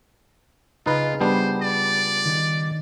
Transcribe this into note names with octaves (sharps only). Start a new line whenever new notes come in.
C#2 D#4 F4 G#4 B4 D#5 G#6
G3 B3 D4 C5
D5
D#3 G6